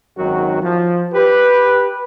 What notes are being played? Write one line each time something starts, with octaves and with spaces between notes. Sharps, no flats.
G#1 F#2 D#3 F#3 F#4
F3
G4 B4